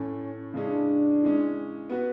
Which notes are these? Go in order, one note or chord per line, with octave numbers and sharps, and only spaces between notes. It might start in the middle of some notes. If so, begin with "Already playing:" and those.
Already playing: A2 E3 A3 C#4
C#3 E3 G#3 C#4 D4 G#4
E3 G#3 C#4
B3 F#4 B4